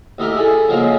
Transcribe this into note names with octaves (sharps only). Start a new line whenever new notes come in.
D2 D#4 E4 G4 A#4
E4 G#4 A4
C#3 F3 F#3 G#3 A#3